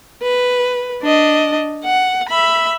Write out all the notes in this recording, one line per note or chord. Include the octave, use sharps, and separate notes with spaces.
B4
D4 D#5
F#5
E5 B5